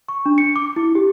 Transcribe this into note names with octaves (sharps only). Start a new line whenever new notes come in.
C#6
D4
C#7
D6
E4
G4